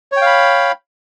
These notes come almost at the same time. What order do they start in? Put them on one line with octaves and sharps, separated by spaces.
C#5 G5 F5 B5